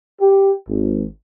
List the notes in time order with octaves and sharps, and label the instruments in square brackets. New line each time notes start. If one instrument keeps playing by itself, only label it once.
[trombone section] G4
G#1